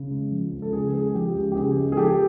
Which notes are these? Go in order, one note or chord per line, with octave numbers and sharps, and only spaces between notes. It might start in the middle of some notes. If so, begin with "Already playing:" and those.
Already playing: C#3
G#3
F3
C#2
A4
C#3 G#4
G#3 G#4
F3 G4
C#2
G4
C#3 G#4
G#3
G#4
F3 G4 A4